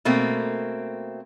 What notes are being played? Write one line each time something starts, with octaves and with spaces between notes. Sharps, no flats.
B2 A3 A#3 C4